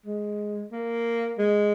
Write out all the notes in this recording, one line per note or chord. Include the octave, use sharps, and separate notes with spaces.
G#3
A#3
G#3